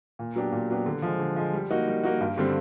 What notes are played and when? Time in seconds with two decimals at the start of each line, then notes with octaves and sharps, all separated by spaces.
0.19 A#2
0.36 F#3 B3 D4 G4
0.52 A#2
0.70 F#3 B3 D4 G4
0.86 D3
1.02 F3 G#3
1.19 D3
1.36 F3 G#3
1.53 G3
1.70 A#3 D#4 F#4
1.87 G3
2.03 A#3 D#4 F#4
2.21 G2
2.38 D3 G3 C4